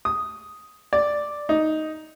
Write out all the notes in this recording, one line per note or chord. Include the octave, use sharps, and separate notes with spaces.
D#6
D5
D#4